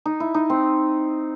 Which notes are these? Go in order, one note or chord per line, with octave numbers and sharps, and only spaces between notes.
D#4
E4
D#4
C4